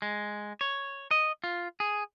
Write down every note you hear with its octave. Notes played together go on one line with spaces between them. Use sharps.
G#3
C#5
D#5
F4
G#4